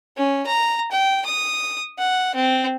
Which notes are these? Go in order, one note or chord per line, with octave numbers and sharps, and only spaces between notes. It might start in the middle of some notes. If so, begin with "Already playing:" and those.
C#4
A#5
G5
D#6
F#5
C4